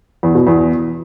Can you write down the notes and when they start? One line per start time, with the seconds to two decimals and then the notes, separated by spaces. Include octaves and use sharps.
0.23 E2
0.35 B2
0.47 E2